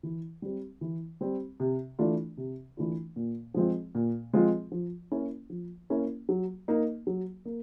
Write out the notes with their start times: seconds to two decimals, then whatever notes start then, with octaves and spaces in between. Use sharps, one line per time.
0.03 E3
0.42 G3 C4
0.81 E3
1.21 G3 C4
1.60 C3
1.99 E3 A3 D4 F4
2.37 C3
2.77 E3 A3 D4 F4
3.16 A#2
3.54 F3 G#3 C4 F4
3.95 A#2
4.33 F3 G#3 C4 F4
4.72 F3
5.12 A#3 C#4 E4
5.50 F3
5.90 A#3 C#4 E4
6.29 F#3
6.68 A#3 D#4
7.07 F#3
7.45 A#3